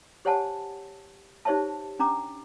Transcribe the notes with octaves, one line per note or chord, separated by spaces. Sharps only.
G4 C5 C#5 F#5 G#5 A5
D#4 G4 C5 C#5 E5 A5
C#4 D4 A#5 D6